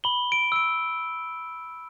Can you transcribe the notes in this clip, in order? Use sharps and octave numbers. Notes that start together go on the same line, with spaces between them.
B5 G7
D7
E6 D7